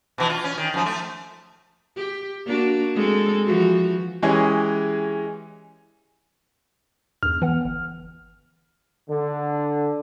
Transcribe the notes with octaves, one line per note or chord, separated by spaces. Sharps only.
B2 E3
F4
C#4
D#3
F#2 F3
A3
G4
A#3 D4 F#4
G#3 C4 A4
E3 F3 F#4
E3 G#3 C#4 G4 G#4 D#5
E2 G2 F6
E3 B3 F#5
G1
D3